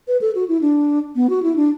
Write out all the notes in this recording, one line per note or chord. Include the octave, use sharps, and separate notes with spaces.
B4
A4
F#4
E4
D4
B3
F#4
E4
D4